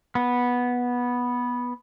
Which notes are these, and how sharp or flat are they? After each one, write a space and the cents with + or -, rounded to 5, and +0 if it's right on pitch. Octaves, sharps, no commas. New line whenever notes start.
B3 -10